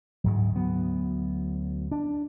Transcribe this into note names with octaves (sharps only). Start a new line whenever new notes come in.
D2 G#2 F#3
D2 F#3 B3
D4